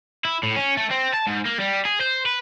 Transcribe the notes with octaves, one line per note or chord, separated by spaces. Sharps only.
E4
A2
C#4
A3
C4
A5
G#2
A#3
G3
G#4
C5
B4